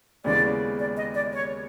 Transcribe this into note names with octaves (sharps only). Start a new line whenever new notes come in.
D#2 C#3 E3 G#3 B3 D5
D5
D#5
D5
C#5